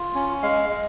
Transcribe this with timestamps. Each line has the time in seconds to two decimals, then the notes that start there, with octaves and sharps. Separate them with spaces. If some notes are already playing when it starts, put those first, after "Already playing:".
Already playing: F4
0.15 C#4
0.43 G#3 F5
0.69 G#3